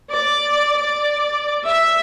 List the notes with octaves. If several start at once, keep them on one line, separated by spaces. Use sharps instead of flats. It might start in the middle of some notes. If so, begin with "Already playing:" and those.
D5
D5
E5